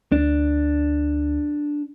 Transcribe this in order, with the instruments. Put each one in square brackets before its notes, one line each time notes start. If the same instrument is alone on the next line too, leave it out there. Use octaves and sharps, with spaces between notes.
[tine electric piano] D2 [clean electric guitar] D4